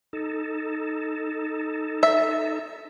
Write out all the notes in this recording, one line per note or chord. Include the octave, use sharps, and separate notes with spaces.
D#4 A4
E5